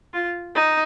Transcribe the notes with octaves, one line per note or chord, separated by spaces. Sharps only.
F4
D#4